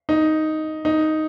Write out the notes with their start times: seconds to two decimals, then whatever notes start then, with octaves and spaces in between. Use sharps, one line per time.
0.09 D#4
0.85 D#4